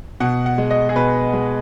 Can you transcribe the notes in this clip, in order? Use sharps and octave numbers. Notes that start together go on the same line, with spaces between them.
B2 F#5
F#5
G#3
D#5
G#4
B2 B4
G#3